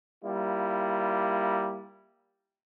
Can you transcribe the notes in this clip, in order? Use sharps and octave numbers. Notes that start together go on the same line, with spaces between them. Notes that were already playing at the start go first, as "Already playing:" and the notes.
G3 A#3 E4 F4